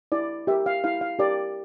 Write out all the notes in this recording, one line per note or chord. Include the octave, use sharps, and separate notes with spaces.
E4 D5
G4 A#4 E5
F5
E4 F5
F5
G4 A#4 D5